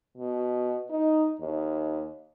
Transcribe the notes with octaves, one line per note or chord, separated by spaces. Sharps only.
B2
D#4
D#2